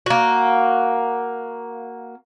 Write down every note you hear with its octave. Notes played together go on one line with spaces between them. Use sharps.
A#3 F#4